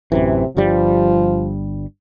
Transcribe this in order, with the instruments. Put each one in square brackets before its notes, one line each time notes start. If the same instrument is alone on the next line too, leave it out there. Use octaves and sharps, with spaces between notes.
[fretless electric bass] A1 F#2 E3 [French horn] C3
[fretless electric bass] G1 G2 G3 [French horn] F3